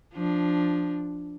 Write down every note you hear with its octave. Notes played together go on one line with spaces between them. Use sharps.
F3 D4